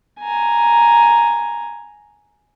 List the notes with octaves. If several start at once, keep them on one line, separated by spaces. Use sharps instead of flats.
G#5 A#5